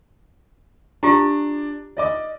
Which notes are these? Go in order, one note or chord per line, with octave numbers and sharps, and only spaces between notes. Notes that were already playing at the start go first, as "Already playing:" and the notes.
D4 F4 G4 A#5
D5 D#5 D6